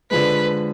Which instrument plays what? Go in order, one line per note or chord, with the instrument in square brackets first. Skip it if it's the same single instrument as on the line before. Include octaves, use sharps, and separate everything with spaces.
[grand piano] D3 F3 G#3 [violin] B4